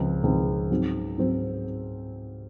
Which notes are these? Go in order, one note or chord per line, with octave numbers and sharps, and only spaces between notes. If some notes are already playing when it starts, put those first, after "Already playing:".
Already playing: C#2 C#3 F3 C4
C#2 C#3 F3 C4
G#2 F#3 C4
G#2 F#3 C4